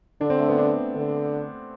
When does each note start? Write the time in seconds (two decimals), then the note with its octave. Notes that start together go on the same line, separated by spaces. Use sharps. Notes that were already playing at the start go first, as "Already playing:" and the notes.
0.21 D3 D4
0.30 C4
0.39 A3
0.49 B3
0.58 D4
0.95 D3